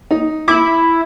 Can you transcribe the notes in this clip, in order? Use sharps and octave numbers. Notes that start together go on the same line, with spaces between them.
D#4
E4 D6